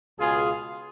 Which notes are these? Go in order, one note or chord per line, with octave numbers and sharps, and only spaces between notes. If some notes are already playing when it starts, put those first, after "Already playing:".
C#2 B2 F4 G#4